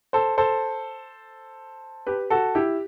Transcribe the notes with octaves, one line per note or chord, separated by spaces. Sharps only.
A4 C5
A4 C5
G4 B4
F#4 A4
E4 G4